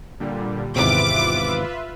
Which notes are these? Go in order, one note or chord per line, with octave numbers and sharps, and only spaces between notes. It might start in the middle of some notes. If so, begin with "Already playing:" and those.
A#2 D3 G3
G#1 E2 C3 F4 B4 E5 D6